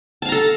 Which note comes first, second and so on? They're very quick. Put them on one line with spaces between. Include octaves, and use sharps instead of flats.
A5 F5 A#5 A4